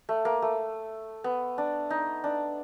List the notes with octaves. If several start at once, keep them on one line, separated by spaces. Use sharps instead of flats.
A3
A#3
A3
B3
D4
D#4
D4